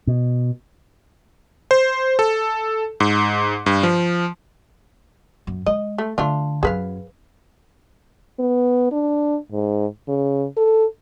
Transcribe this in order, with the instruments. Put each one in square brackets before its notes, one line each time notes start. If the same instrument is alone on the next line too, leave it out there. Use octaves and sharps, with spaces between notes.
[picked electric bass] B2
[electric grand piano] C5
A4
G#2
G2
F3
[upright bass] F#2
[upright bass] G#3 [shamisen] D#5
[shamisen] A3
[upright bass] D3 [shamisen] A3 D4 F4
[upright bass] F#2 F#3 [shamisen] G#4 B4 F5
[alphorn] B3
D4
G#2
C#3
A4